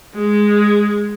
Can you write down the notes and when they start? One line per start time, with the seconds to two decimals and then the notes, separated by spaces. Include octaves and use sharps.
0.14 G#3